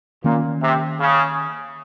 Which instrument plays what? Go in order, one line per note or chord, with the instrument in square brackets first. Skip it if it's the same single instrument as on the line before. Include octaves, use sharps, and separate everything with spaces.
[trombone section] A#2 [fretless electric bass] D#3 A#3 C#4
[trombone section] C3
C#3